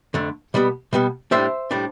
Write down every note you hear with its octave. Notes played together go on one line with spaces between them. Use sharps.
F2 D3 A3
B2 G3 B3
B2 G3 B3
A2 G3 D4 C5 E5
A2 G3 D4